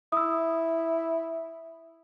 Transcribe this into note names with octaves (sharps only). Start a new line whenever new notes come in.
E4 D#6 E6